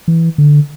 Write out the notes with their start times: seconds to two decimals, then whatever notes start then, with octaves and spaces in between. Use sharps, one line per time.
0.08 E3
0.38 D3